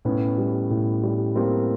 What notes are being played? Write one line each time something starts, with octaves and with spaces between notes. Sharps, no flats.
A2 B3 C#4
G3
A2
G3
G3 A#3 C4